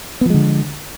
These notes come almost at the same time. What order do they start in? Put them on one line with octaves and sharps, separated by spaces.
B3 F3 G#3 D3